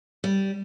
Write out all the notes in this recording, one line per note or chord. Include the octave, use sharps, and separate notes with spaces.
G3